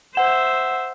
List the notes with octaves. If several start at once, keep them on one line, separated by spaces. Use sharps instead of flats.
C5 E5 F#5 E7